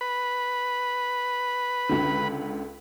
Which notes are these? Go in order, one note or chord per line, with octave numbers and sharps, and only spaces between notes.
B4 B5
C#2 D3